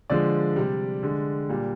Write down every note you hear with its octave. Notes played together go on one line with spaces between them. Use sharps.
D3 F3 G#3 D5
C3 G3
D3 G#3
A#2 G3